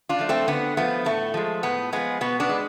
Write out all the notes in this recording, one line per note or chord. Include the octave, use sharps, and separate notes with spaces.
D4 F4
F3 A3
A3 C4
D3 B3
F3 A3 B3
A2 A3
F3 G#3
A2 B3
F3 G#3 B3
B2 B3
B3 D4
G#3